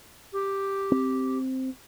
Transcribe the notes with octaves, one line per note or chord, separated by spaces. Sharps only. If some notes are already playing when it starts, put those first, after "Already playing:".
G4
C4